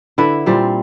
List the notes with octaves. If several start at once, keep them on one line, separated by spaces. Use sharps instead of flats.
D3 E4 B4
A#2 G3 C4